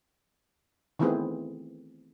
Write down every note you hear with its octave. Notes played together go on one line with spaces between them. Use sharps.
D#3 E3 A3 B3 C4 G#4